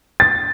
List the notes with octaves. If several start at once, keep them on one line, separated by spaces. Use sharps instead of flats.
A6